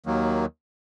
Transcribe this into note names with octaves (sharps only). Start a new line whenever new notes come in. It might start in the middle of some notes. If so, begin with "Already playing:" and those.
D#2 D#3 F#3 A#3